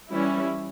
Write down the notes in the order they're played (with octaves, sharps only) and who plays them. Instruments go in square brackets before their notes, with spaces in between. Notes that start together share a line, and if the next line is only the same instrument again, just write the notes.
[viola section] E3 G3 C#4 E4